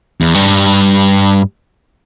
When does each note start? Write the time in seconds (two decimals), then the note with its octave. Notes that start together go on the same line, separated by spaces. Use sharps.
0.21 E2
0.34 G2